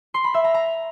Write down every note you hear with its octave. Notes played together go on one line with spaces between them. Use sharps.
C6
B5
E5
A#5
A#5